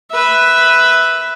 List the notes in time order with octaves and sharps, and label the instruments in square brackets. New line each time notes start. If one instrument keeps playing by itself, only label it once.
[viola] B4 E5